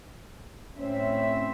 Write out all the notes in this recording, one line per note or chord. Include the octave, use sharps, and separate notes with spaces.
A2 C4 C#4 E5